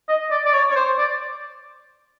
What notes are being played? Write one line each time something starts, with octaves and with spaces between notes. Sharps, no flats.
D#5
D5
D5
C#5
C#5
C5
D5